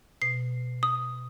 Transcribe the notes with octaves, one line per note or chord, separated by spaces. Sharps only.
B2 C7
D#6